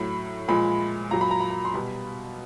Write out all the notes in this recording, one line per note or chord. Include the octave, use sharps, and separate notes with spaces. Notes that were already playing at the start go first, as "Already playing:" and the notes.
Already playing: A2 F#3 B5
A#2 F3 G#3 B5
A#2 F#3 A#5
B5
A#5
B5
A#5
C6
B2 G3 B5